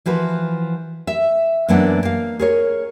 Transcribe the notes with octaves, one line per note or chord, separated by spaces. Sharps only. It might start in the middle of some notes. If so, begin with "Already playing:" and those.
E3 F3 F#4 B4
E5
F#2 E3 A#3 B3 D4 F#5
A#3 F5
G#4 A#4 C#5